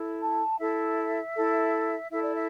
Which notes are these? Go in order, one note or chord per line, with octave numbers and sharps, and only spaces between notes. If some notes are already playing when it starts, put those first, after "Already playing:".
Already playing: E4 A4
A5
E4 A4 E5
E4 A4
E4 A4 E5
D5
E5